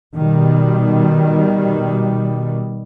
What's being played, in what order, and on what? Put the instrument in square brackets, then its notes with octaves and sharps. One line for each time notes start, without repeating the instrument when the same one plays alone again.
[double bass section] B2 D#3 G3